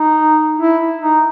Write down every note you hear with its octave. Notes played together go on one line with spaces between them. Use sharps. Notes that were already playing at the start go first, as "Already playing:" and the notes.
Already playing: D#4
E4
D#4